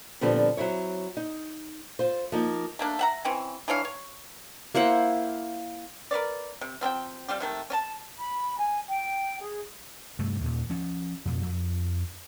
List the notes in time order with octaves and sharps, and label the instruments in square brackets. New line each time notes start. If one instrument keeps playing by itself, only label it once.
[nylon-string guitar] A#2 D3 F3 G3 B3 C4
F#3 C4 E4 C#5
D#4
F4 C5
F3 A#3 D#4
[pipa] A3 A#3 D4
E5 F#5 A#5
E3 C4 C#4
E3 D4 C#5 F5
C#5
[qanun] A#3 E4 C5 F#5
[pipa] A#4 B4 C#5 D5
C3
F3 C4 E4 G5
G3 C4 F4 G4
C3 D#3 A3
C#4 A5
[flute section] B5
G#5
G5
G#4
[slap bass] G2 C3 A3
D#2 A#2
F3 C#4
F2 B2
F2